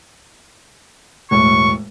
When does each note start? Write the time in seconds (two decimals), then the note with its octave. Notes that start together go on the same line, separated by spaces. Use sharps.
1.31 E1 A2 C#6